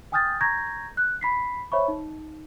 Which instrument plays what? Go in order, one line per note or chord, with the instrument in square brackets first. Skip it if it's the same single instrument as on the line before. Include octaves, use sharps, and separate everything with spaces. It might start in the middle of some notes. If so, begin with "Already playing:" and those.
[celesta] G5 G#5 D#6 F6 G6 A6
A#5 C#6 G6 G#6 A#6
F#6
B5 B6 C7
C5 C#5 E5 B5 C#6
D#4